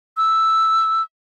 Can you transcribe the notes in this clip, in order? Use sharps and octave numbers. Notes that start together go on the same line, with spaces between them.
E6